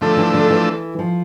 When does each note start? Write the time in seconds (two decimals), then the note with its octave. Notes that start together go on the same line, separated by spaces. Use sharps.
0.01 D3 F3 A3 D4 A4
0.17 E3
0.34 D3
0.50 E3
0.99 F3